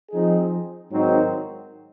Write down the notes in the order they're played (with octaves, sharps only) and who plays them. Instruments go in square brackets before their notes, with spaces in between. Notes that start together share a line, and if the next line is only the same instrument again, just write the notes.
[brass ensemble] F3 C4 D#4 G#4
G#2 D#3 F#3 C4 D#4